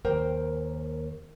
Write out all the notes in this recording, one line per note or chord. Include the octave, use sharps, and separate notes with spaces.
D#2 A#4 C5 G5